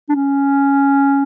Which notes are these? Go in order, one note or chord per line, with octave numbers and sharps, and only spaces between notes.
D4
C#4